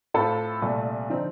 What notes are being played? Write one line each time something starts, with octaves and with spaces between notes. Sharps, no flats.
A2 A3 C4 F4 A4
C2 A#2 A3
D3 F3 C4 D#4